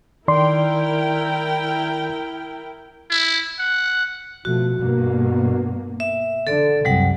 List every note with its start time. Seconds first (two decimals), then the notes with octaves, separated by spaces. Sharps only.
0.28 D#3 E4 A#4 D5 G5 C6
3.11 E4
3.59 F#5
4.45 B2 F3 A3 F#4
4.79 G2 B2 A#3
6.00 E5
6.47 D3 A4 D5
6.85 C2 F#2 C3 F#3 G3 F#5